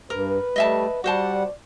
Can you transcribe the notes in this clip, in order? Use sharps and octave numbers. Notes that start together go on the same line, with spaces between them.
G2 A#4 B4
G3 A3 D#5 E5 A5
G3 F#4 C5 D5 F#5 A5